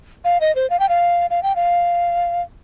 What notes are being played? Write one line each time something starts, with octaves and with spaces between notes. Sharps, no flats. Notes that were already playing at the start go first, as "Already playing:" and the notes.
F5
D#5
C5
F5
G5
F5
F5
G5
F5